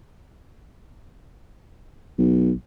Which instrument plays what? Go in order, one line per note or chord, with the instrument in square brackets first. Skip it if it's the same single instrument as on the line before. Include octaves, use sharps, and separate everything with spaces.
[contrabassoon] B1